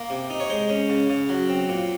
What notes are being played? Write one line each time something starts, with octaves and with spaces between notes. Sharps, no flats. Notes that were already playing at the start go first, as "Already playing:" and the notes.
Already playing: A#3
C3
D#4
C#5
G#3 C5
C#4
C#3
C#3
F#3
C4
A#2